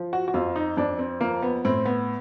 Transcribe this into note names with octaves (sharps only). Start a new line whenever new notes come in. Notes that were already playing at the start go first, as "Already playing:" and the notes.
Already playing: F3
F#4
F#4
F2 F4
D#4
F2 D4
C4
F3 A#3
B3
A2 C4
B3